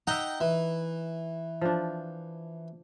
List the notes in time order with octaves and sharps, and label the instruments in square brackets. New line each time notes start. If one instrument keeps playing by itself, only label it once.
[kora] D#4 E5 [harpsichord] F#5 G5 A#5
[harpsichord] E3
[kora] F3 D4